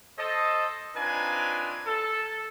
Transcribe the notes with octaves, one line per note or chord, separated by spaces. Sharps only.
A4 C5 D#5
C4 D4 D#4 F4 B4 G#5
A4